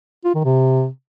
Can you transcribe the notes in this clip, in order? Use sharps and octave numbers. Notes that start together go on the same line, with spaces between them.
F4
D#3
C3